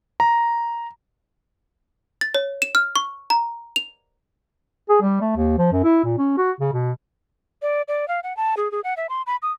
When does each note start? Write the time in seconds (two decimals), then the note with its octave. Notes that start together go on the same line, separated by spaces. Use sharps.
0.20 A#5
2.21 A6
2.35 C#5
2.62 E7
2.75 F6
2.96 C#6
3.30 A#5
3.76 F7
4.89 G#4
5.02 G3
5.21 A3
5.36 D#2
5.58 F3
5.72 F#2
5.84 E4
6.04 A#2
6.18 C#4
6.37 F#4
6.60 C#3
6.73 B2
7.62 D5
7.88 D5
8.08 F5
8.23 F#5
8.37 A5
8.57 G#4
8.72 G#4
8.84 F#5
8.97 E5
9.09 C6
9.27 B5
9.42 D#6